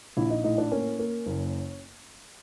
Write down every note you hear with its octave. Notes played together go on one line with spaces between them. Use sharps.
A#1 E4
D#4
A2 D#4
D4
A#3 C#4
A#3
F#1